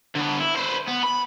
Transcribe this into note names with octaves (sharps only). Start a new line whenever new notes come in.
D3 B3
E4
B4 C5
B3
B5